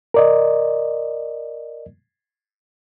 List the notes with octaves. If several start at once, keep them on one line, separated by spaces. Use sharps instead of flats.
A#4 D5 D#5